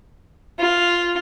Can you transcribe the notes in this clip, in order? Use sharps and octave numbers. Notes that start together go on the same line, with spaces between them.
F4